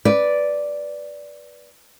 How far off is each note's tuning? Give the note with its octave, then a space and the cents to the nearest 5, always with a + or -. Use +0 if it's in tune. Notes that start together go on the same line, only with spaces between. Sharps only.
B4 -5 D5 -5